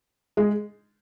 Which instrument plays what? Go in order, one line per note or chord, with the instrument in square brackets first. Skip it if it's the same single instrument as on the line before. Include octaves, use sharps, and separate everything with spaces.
[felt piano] G#3